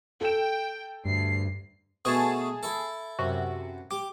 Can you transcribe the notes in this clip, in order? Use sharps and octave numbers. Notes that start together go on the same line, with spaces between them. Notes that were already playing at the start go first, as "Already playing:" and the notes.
A4 G5 E7
D2 G2 C7
B2 A3 F#4 G#4 A5
E4 A4
F#2 C3 F#4
G4 D6